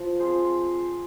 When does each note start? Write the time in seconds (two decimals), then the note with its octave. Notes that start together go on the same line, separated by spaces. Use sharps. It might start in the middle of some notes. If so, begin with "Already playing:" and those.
Already playing: F3
0.19 C4 F4 G#4 C5